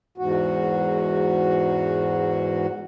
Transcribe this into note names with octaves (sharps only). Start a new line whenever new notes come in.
E2 G#2 F#4